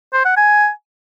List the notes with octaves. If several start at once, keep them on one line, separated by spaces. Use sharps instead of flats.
C5
F#5
G#5